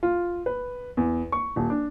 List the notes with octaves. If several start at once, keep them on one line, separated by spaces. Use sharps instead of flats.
F4
B4
E2
C#6
D#1
D4